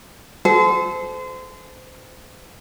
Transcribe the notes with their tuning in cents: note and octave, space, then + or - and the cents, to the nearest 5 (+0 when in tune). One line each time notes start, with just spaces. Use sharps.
A4 -35 C5 -30